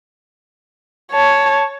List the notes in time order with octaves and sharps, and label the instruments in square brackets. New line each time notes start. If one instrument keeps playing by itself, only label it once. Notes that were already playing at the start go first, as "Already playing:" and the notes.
[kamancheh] C#5 A5